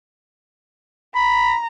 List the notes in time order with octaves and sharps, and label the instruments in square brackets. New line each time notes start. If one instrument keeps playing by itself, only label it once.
[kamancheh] A#5 [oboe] B5